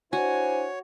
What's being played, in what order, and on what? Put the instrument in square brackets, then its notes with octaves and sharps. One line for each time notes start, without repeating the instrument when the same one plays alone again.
[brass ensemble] D4 E4 C5 [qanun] F#4 [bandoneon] C#5 [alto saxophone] G#5